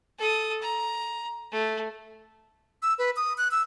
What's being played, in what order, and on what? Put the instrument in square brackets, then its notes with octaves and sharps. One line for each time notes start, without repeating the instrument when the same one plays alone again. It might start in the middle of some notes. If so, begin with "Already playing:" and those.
[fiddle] A4 D#6
A#5
A3
[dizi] E6
B4
D#6
F#6
E6